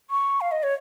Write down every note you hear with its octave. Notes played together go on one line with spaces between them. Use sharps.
C#6
F5
D#5
C#5